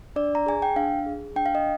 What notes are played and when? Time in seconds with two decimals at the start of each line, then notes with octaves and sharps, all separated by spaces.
0.16 D4 D5
0.35 A#5
0.46 G#4 G#5
0.62 G5
0.76 D4 F5
1.06 G#4
1.36 D4 G5
1.46 F5
1.55 D#5